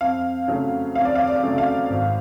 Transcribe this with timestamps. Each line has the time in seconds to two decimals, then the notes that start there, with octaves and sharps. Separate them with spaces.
0.01 F2 F5
0.48 C#3 F#3 A3
0.95 F2 F5
1.05 D5
1.15 F5
1.27 D5
1.43 C#3 F#3 A3
1.58 F5
1.90 G#1